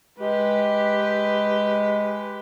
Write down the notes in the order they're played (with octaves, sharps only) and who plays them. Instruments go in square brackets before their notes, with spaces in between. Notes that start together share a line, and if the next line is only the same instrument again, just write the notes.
[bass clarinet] G#3 [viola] G4 B4